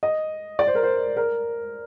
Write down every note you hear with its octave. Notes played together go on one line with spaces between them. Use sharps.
D#5
D5
C5
A#4
C5
A#4